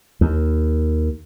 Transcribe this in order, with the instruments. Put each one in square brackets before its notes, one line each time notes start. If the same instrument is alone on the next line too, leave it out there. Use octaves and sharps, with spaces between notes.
[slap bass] D#2